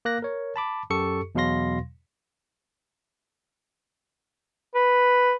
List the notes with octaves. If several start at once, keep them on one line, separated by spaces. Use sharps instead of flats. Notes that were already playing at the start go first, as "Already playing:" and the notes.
A#3 F#6 A#6
A#4 C#5
A5 B5 D6
F#2 G4 A4 C#6 C#7
E2 B2 F#3 F5 C6 A#6
B4